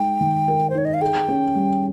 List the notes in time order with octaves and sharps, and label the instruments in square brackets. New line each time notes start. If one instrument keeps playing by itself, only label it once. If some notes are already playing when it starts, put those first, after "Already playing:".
Already playing: [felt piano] G#3 D#4 [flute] G5
[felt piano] D#3
A#4
[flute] C5
[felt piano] D#4 [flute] C#5
[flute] D#5
F5
[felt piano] G#4 [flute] G5
[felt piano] C#4
G3